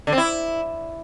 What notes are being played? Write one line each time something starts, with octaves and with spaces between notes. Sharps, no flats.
D3
C4
E4